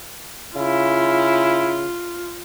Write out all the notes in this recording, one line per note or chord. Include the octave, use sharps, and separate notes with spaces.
C#3 E4 F4